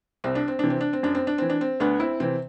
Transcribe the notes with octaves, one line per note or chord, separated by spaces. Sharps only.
C2 C4
D4
C4
C3 E3 D4
C4
D4
C4
F#2 D4
C4
D4
E3 C4
D4
C4
D2 B3 D4
C4 E4
C3 E3 C4